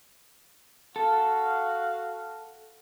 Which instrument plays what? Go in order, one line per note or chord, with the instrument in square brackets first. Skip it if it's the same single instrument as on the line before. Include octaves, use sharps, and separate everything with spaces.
[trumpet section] F#4 F5 [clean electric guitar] A4